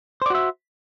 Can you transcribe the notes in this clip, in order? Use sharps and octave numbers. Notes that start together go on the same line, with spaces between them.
F#4 C5 D5 E5